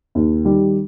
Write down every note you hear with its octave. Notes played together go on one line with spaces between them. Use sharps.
D#2
D#3 G3